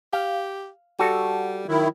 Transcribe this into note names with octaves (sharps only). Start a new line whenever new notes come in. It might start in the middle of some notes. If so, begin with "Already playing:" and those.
G4 F5
G3 F#4 A4
D#3 F#3 E4